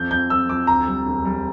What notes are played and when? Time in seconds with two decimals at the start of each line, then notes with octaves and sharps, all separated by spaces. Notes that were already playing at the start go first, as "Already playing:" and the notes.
Already playing: F2 G6
0.11 F2 G6
0.30 F2 E6
0.49 F2 D6
0.67 D2 A#5
0.87 G3
1.06 E1
1.25 G3